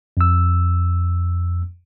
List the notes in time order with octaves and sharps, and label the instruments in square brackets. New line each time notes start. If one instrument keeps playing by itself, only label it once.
[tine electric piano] F2 E6